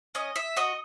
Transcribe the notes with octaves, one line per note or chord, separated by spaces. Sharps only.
C#4 D#5
E5
F#4 D#5